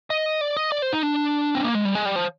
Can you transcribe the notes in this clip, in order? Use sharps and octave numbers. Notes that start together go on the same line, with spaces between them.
D#5
D5
D#5
D5
C5
D#4
D4
C4
A#3
G#3
G3
G#3
G3
F3